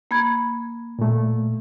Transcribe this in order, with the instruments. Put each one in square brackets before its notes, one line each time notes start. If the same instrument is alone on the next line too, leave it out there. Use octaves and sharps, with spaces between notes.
[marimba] A#3 B5 G#6
[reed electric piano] A#2 A3